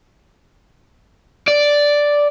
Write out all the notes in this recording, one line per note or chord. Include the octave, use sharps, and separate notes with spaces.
D5